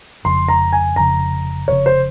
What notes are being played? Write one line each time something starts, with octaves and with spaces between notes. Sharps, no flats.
F1 F2 C#3 C6
A#5
G#5
F1 F2 C#3 A#5
F1 F2 C#3 C#5
C5